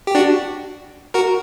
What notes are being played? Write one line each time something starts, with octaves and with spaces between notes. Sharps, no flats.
G4
D4 F#4
F#4 A#4